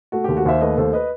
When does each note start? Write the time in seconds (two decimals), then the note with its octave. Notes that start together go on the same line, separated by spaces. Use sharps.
0.12 A3 F#4
0.24 D#2 G4
0.37 F#4
0.45 D#2 C5 E5
0.61 A3 B4 D#5
0.77 D#2 A4 C5
0.93 B4 D#5